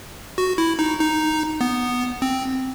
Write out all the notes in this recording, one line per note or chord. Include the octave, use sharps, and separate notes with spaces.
F#4
E4
D#4
D#4
B3
C4